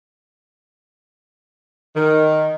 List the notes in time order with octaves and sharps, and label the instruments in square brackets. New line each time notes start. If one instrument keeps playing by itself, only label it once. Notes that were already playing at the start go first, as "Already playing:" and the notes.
[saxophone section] D#3